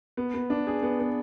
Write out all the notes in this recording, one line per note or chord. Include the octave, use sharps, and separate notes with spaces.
B3
B3
D4
G#4
B3
B3